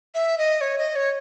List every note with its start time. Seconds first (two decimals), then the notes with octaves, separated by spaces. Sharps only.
0.15 E5
0.38 D#5
0.61 C#5
0.78 D#5
0.96 C#5